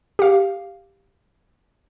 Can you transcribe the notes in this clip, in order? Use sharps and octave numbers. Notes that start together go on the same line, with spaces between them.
G4 F5